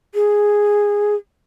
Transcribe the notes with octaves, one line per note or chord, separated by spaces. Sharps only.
G#4